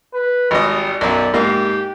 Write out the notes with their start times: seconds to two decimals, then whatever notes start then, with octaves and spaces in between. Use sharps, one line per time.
0.14 B4
0.51 G#1 G3 D#5
1.01 B1 F#2 D5
1.34 G#2 A#3 G4